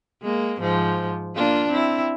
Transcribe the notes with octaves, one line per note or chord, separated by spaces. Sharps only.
G#3 A#3
G#2 F3
A#3 D4 F4
C4 E4